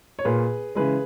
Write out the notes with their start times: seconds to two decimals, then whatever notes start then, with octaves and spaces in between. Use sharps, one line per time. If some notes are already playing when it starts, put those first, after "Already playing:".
0.19 C#5
0.25 A#2 A#3 G#4 B4
0.75 C#3 E3 G#3 G#4 B4